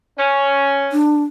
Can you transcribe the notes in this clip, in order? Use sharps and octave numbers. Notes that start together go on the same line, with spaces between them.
C#4
D4